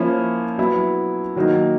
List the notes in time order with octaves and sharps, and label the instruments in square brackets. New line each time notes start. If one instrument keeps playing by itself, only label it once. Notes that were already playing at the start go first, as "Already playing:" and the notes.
Already playing: [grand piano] F3 A#3 C#4 E4
F#3 B3 E4
D#3 F#3 A#3 D#4